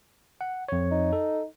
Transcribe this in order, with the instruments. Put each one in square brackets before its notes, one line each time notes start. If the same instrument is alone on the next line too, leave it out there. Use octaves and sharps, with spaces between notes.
[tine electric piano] F#5
F2 C#5
[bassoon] D#4
[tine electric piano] A4